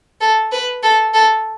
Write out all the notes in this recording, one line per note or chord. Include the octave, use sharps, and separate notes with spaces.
A4
B4
A4
A4